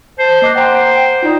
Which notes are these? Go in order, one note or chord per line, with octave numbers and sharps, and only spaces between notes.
C5 A5
A#3 D#5 D6 F#6
C5 F#5 G5 A#5 C6
D#4 F4 D5